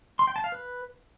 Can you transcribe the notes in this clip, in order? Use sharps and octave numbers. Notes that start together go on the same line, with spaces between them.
C6
G5
A5
F5
B4